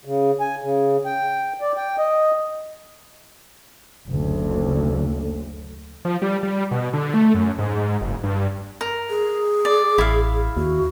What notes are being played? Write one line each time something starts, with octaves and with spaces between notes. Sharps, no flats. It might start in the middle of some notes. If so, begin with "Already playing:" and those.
C#3
G#5
C#3
G5
D5
G5
D#5
F#1 D2
F3
G3
G3
B2
D3
A3
F#2
G#2
F#1
G2
A#4
G#4
D5
A1 E4 F5
D#2 F#4